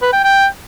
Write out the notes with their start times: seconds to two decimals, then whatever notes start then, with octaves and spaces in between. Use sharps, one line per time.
0.02 B4
0.13 G5
0.24 G5